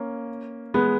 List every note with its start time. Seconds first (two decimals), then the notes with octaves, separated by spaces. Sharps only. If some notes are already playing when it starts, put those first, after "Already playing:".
Already playing: A#3 C#4
0.74 G#3 B3